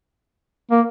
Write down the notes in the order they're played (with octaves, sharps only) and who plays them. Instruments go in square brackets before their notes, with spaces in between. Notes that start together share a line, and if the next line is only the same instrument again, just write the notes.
[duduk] A#3